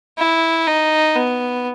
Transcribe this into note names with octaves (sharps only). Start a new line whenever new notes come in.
E4
D#4
B3